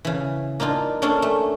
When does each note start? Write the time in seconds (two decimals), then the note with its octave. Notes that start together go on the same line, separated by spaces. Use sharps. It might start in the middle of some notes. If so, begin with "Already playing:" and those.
0.05 C#3 E3
0.60 A#3 D4 D#4 F4
1.02 A#3 C#4 D4 G#4 A4
1.22 A3